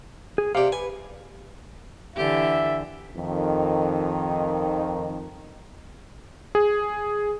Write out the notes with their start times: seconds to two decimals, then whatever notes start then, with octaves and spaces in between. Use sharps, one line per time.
0.38 G#4
0.55 C3 G4 D5 F5
0.72 B4 G#5
2.16 D3 E3 G4 E5
3.16 F2 D#3
6.55 G#4